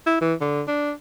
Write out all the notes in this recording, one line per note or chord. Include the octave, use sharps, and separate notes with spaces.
E4
E3
D3
D4